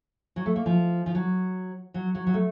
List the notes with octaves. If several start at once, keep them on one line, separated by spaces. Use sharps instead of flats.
F#3
A3
A#3
F3
F3
F#3
F#3
F#3
F#3
A3